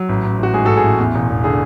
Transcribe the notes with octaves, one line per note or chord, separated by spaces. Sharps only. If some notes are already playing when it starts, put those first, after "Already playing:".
Already playing: F#3
A1
A1
A1 F#4
G#2 G#4
F#4 A4
A1
G#4
A1
E2
E1
E1
D3 G#4